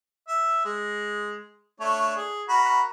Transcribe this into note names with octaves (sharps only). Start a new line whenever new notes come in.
E5
G#3
A3 D4 C#5
G#4
F#4 A#4 B5